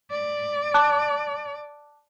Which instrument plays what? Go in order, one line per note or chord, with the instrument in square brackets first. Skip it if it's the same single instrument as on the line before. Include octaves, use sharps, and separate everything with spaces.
[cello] D5
[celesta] A5 D6 F#6